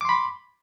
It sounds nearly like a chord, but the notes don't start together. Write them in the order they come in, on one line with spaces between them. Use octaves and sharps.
D6 C6 B5